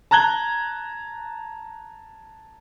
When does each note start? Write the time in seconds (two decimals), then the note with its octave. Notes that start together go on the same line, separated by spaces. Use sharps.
0.11 A5 A#5 F#6 G#6 G7